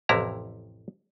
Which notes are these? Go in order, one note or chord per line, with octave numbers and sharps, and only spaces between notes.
A1 F2 C3 E4 A#5